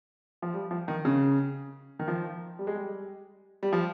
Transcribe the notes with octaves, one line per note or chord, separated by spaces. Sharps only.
F3
G3
F3
D#3
C#3
D#3
F3
G3
G#3
G3
G3
F3